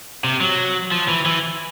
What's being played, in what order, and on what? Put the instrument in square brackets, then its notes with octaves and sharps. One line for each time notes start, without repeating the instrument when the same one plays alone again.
[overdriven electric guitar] C3
F#3
F3
E3
E3